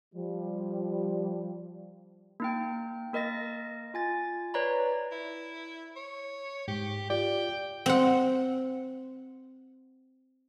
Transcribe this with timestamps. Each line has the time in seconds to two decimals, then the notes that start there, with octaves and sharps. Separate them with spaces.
0.14 F3 G3
2.40 A#3 D#4 G5
3.13 A#3 A#4 D#5 A6 A#6
3.94 F4 G#5 A6
4.54 B4 C#5 D5 A#5 B5
5.12 E4
5.96 C#5
6.68 G#2 G4
7.10 F4 G4 D5 G5
7.86 C4 F#5